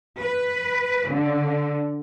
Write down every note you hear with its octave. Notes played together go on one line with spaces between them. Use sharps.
B4
D3